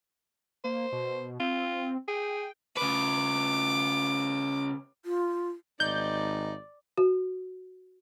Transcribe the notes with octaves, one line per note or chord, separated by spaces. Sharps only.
A#3 C5
B2
C4 F4
G#4 G5
C#3 B4 D6
F4
G#1 D#4 D5 G6
F#4